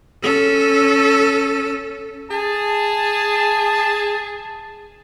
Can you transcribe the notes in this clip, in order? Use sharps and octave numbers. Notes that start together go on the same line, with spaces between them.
C#4 A4
G#4 A5